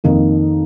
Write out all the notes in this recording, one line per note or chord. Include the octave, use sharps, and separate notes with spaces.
F2 D#3 A#3 D#4